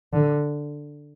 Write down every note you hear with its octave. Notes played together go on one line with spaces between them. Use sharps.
D3